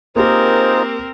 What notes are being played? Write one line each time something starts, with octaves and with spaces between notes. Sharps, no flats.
A#3 C4 D#4 F4 G4 G#4 A#4 C5